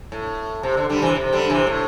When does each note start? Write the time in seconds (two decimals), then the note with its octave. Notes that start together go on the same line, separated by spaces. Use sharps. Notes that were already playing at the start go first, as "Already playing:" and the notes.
0.12 A2
0.63 C3
0.77 D3
0.89 D3 G3
1.02 C3 E3
1.15 C3
1.33 D3 G3
1.49 C3 E3
1.67 A2